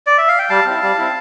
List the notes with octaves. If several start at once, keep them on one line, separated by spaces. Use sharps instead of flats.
D5
E5
F5
G5
G3 F5 A5
C4 E4
G3
C4 E4